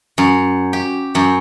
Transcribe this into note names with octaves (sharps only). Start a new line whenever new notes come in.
F#2
G4
F#2